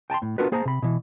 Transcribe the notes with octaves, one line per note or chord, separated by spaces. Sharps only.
G5 A5 A#5 C6
A2
B3 D4 F4 F#4 A#4 B4
A#3 G#4 C5 A5 A#5
C3 B5
B2 E3